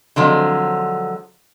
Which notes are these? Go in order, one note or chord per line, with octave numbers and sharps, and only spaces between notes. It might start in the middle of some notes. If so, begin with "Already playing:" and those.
D3 F3 F#3 G#3 C4